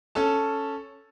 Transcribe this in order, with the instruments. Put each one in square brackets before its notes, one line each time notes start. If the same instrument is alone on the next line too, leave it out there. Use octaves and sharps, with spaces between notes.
[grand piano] C#4 A4 A5